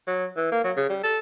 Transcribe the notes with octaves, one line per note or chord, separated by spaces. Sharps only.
F#3
E3
A#3
F#3
C#3
G3
A4